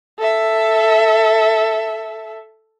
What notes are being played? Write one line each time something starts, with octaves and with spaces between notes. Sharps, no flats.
A4 E5